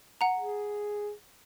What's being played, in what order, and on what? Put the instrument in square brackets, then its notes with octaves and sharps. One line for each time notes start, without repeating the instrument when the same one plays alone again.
[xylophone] F#5 A#5
[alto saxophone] G#4